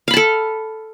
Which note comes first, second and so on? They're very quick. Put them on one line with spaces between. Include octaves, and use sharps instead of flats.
F5 B5 A5 A4